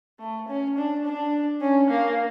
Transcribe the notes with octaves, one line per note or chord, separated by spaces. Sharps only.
A3
C#4
D4
D4
C#4
A#3